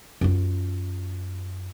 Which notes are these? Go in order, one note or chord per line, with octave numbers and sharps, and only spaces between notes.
F#2 F4